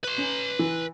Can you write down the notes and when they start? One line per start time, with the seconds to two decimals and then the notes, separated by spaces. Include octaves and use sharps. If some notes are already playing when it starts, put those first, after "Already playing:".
0.04 B4 C6
0.18 C#4
0.59 E3